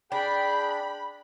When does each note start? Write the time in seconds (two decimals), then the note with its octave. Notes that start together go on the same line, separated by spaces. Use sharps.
0.12 D4 G#4 G5 B5